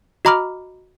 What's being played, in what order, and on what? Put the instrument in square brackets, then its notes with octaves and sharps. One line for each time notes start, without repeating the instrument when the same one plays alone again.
[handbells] F#4 D#5 A#5 B5 D6 F6